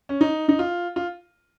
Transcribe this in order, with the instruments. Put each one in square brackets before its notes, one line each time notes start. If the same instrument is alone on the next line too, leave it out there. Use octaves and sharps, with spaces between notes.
[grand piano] C#4
D#4
D#4
F4
F4